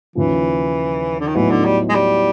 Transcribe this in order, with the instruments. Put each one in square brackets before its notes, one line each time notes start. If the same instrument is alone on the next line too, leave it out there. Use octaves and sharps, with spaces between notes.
[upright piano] D#2 C#3 F3 [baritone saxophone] E3
[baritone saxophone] D3
D#3
[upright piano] A2 F#3 B3 D#4 [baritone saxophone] E3
[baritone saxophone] D3
G3
G#3
G3